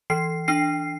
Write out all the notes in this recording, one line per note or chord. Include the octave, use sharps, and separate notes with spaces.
E3 C7
D4 C7